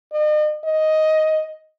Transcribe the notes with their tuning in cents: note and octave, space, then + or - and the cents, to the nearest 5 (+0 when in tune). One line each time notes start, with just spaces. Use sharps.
D#5 -40
D#5 +10